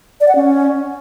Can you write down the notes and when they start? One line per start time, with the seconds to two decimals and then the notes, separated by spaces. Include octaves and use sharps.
0.20 D5
0.28 F#5
0.35 C#4